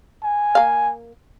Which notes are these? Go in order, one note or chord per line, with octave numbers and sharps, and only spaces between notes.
G#5
A#3 F5